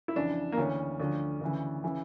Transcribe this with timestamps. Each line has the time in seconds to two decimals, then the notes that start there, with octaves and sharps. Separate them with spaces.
0.08 E4
0.15 F2 C#3 E3 D4
0.52 A#3
0.57 D2 C#3 E3 C#4
0.99 D2 D3 F3
1.41 D2 C#3 E3
1.83 C#3 E3